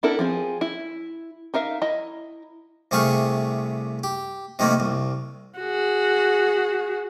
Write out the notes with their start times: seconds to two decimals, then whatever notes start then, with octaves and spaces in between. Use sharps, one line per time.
0.03 B3 D4 E4 A4 A#4
0.19 F3 C4 G#4
0.61 E4
1.54 D#4 A#4 E5 F5
1.82 E4 D#5 A#5
2.91 C2 C3 A3 G#4 F5 C#6
4.04 G4
4.59 C3 D#3 F3 A3 A#3
4.80 C2
5.59 F#4 G#4